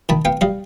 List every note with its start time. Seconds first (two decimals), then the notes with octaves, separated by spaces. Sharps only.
0.09 D#3 A5 B5
0.25 B3 F5 G5
0.41 G3 D#5 F5